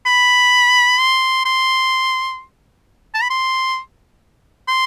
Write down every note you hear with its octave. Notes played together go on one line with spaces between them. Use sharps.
B5
C6
C6
A5
B5
C6
C6